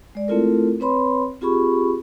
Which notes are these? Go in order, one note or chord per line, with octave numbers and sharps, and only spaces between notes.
G#3 D5
A3 C4 E4 F4 A4 A#4
C4 B4 C#5 B5 C6
C4 F4 G4 G#4 B5 C#6